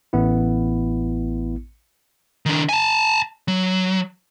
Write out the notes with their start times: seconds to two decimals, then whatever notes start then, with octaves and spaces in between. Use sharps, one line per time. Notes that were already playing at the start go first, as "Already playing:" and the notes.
0.13 A1 B3 E4
2.46 D#3 D4
2.69 G#5 A5
3.48 F#3